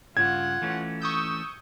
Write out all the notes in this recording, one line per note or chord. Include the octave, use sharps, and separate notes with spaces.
G2 C#3 F4 F#5 G#6
E3 A3 C#4
C#6 D#6 E6 G6